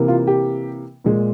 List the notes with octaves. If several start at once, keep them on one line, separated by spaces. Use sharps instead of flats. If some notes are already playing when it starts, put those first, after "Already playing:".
Already playing: C3 E3 A#3
F4
G4
A#2 G#3